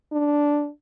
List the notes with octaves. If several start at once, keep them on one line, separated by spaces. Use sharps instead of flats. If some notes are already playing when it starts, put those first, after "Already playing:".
D4